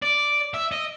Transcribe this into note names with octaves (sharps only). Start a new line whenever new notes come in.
D5
E5
D#5